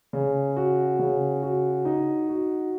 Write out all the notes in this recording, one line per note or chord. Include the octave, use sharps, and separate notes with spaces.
C#3
F#4
C#3
F#4
D#4
F#4